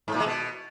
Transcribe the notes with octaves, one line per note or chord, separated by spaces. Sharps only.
G#2
A#2
G#3
B2